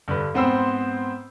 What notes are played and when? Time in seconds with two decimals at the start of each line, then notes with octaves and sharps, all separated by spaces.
0.08 G2 D3 B4
0.34 G#2 B3 C4 C5 B5 E6